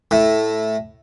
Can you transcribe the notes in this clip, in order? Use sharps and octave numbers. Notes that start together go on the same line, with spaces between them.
A2